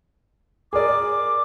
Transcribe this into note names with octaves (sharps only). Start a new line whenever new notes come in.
G#4 A#4 D5 D6